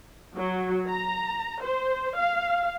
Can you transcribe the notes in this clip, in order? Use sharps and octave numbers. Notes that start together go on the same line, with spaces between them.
F#3
A#5
C5
F5